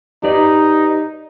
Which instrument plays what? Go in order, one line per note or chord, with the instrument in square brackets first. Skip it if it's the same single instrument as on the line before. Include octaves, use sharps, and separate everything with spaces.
[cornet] D#4 [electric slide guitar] G4 B4 D5